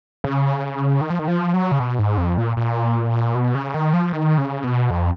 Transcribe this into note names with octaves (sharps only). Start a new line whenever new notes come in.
C#3
D#3
F3
D#3
F3
F#3
C#3
B2
G#2
F2
A#2
A#2
B2
C#3
D#3
F3
D#3
C#3
B2
F2